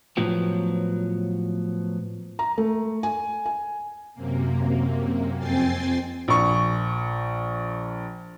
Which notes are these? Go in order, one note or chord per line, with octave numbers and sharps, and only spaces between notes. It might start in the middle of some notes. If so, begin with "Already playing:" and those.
A2 F3 F#3 B3
A#5
A3
G#5
G#5
F#2 C3 A#3
F2 C4 G5 G#5 A6 C7
A#1 C#6